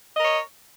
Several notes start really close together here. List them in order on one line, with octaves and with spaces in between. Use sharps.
D#5 A#4 C#5